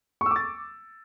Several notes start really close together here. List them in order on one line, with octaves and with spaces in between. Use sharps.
C#6 E6 D6 A6